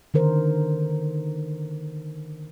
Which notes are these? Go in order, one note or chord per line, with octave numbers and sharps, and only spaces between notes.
D3 D#3 A#4 C5